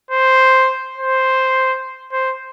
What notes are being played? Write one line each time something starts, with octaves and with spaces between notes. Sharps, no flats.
C5
C5
C5